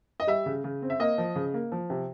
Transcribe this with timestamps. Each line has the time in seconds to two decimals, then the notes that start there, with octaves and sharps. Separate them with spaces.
0.20 D#5
0.27 G3 E5
0.46 C#3
0.64 C#3
0.82 C4
0.90 E5
1.00 A#3 D#5
1.18 F3
1.36 C#3
1.54 A#3
1.72 F3
1.90 C3